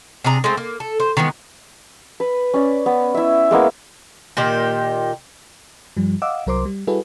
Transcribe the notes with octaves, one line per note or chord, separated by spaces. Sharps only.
C3 D4 G#4 A#5
G#3 A3 C4
A#3
A4
C5
D#3 E3 G#3 B3
B4
C#4 D5
B3
E4 E5
G#3 A#3 B3 E4
A#2 D#3 G4
G2 F3 G3
D#5 F5 F#5 D6 E6
C2 F#3 A#4 C5 C6 D6
G3
G3 E4 F#4 G#4 A4 B4